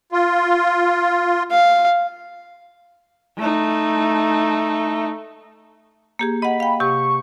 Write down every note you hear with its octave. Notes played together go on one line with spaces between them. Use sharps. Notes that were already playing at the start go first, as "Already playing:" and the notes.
F4
F5
A3 D#4
A#3 G4 G#4
D#5 F#5 B5
F5 G5
C3 G4 C#6